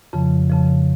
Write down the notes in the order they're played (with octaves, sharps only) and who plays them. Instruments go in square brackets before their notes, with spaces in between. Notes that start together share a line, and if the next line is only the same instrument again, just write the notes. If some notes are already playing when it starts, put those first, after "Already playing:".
[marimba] F2 C#3 F3
F2 C#3 F3